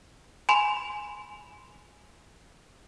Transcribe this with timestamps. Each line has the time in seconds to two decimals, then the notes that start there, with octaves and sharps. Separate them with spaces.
0.49 G#5 B5 C6